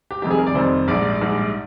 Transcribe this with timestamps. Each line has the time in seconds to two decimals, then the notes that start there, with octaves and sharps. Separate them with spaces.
0.11 G4
0.22 F1 F2 D#3 G3 G4
0.31 G#4
0.38 A#4
0.47 D5
0.55 F1 F2 D#3 G3 C5
0.88 A#1 G#2 G3 D5
1.21 A#1 G#2 G3